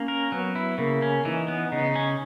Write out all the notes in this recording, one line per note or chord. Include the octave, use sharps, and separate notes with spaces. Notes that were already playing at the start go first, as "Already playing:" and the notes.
Already playing: A#3 C#4
A#4
F#3 B3
E4
C#3 A#3
C#4
E3 D#4
B3
C#3 D#4
C#4